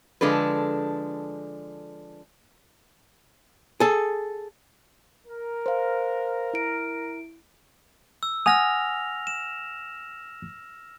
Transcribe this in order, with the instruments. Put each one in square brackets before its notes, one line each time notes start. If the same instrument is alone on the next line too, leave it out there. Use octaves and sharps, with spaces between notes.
[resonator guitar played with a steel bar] D3 F3 G#3 D4 A4 B4
[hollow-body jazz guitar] G#4 A4
[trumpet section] A#4
[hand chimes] C5 F5
E4 D7
[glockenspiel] E6
[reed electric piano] F#5 G#5 D#6 [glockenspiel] F6 A#6 F7
[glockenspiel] E7